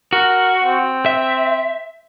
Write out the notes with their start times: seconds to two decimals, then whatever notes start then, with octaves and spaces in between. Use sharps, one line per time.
0.13 F#4 A#4
0.64 C4
1.06 E5